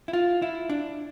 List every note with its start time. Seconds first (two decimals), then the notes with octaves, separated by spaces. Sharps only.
0.08 E4
0.13 F4
0.42 E4
0.69 D4